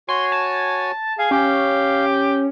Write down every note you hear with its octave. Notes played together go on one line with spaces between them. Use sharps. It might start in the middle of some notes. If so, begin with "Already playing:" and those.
F#4 C#5 G#5 C6
A5
G#4 F5
C#4 G4